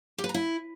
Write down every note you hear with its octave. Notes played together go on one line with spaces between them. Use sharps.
G4
B4
A#5
E4